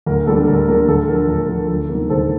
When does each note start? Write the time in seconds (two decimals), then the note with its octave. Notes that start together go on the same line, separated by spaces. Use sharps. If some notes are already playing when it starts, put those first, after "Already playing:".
0.06 D2 A#4
0.27 D3 G3 A#3 A4
0.47 D2 A#4
0.68 D3 G3 A#3 A#4
0.88 D2 A4
1.08 D3 F3 A#4
1.28 D2 A#4
1.48 D3 F3 A#4
1.69 D2
1.89 C3 D#3 G3 A#3
2.09 D2 A4 C5